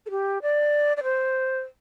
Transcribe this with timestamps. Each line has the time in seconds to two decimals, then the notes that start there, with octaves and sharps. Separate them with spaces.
0.06 A4
0.11 G4
0.42 D5
0.97 D5
1.03 C5